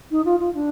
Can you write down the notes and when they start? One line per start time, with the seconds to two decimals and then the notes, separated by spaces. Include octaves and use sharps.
0.10 D#4
0.25 F4
0.39 F4
0.54 D4